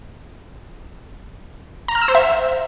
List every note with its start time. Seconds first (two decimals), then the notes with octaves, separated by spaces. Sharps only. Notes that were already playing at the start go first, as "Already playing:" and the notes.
1.88 A#5
1.95 F6
2.02 E6
2.08 C5
2.15 E5